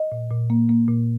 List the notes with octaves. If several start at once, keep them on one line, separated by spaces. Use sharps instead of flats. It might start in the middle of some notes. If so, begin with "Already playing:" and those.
Already playing: D#5
A#2
A#2
A#3
A#3
A#2